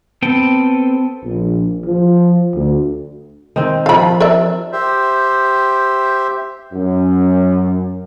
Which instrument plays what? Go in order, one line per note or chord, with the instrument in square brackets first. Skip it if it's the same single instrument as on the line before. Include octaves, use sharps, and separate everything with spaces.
[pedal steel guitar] B3 C4 A4 G5
[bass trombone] A#1
F3
D2
[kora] D#3 C4
[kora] F3 A4 [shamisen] F5 B5
[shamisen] A#4 D5 E5
[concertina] G4 C5 E5
[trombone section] F#2